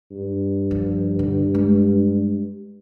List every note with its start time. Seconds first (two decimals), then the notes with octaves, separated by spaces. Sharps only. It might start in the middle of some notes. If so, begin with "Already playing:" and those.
0.11 G2
0.71 F3
1.19 D3
1.54 G#3